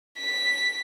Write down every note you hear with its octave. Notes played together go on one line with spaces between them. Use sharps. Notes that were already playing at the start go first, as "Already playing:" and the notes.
B6